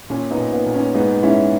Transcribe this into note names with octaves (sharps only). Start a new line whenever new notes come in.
A#2 C#4
B3 D#4
A#2
B3
A#2
C#4
G#2 B3 D#4
G#2 C#4 E4